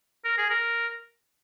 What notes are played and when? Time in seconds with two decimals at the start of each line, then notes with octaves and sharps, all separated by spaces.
0.25 A#4
0.38 G#4
0.50 A#4